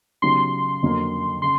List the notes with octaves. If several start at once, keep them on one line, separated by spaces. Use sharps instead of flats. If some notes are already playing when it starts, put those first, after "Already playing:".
C#3 F#3 B3 D#4 G4 C6
F2 D3 F#3 A#3
C#3 C6